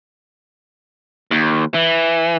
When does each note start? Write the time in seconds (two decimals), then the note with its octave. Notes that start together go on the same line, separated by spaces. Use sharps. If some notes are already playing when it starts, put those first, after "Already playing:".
1.31 D#2
1.74 E3